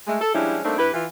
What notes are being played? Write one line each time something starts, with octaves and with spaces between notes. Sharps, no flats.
G#3 A3
A4
F3 G3 G#3 C#4 D4 E4
G3 A3 A#3 C4 D4 D#4
G2 E4 G4 B4
E3 F4